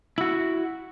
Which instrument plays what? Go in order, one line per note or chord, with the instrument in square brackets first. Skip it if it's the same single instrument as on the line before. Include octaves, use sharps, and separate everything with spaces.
[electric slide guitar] E4 F#4